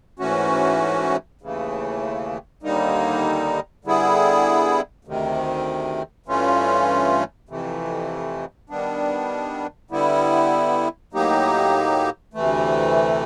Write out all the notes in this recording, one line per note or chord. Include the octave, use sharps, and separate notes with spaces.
G#2 E3 A3 C#4 F#4
D#2 C#3 E3 A3
D#2 D3 G3 A#3 D#4
D3 G3 B3 E4 G#4
D2 C3 D#3
G2 E3 A3 C#4 F4
F2 C3 E3 A3
D#3 G3 B3 D4
D3 G3 B3 E4
A2 F#3 A#3 D#4 G4
D2 C3 E3 A3